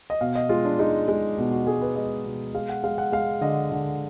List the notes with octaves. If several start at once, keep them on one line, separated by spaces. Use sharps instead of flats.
D#5
B2 F5
D#5
G#3 F4
D4
G#3 D#4
G#3
B2
F#4
G#3 G#4
B4
G#3 D#5
B2
G#3 F5
F#5
G#3 F5
F#5
G#3 F5
D3 D#5
D3